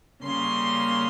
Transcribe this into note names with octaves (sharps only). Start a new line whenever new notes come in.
C#3 G3 A#3 C#4 C6